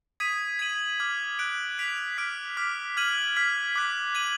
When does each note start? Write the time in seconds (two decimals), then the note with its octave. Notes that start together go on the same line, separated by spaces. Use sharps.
0.20 D#6 G#6 B6 D#7
0.59 G#6 B6 D#7 F#7
1.00 D6 F6 G#6
1.39 F#6 D7 F#7
1.78 F#6 B6 D7 F7
2.18 D6 F6 B6 D7
2.57 D6 F6 B6
2.97 F6 G#6 D#7 F#7
3.36 F6 G#6 B6
3.75 D6 F#6 B6
4.15 G#6 D#7 F#7